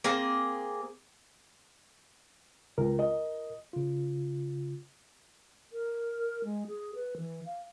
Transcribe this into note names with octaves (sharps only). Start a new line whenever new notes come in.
A#3 C4 G#4
C#2 A#4
D#5
C#3 F4
A#4
G#3
G#4
B4
E3
F5